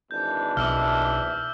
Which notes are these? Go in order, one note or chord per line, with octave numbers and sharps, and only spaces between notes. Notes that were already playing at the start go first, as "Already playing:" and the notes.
G#1 E3 D4 G6
B1 E5 D6 E6 F6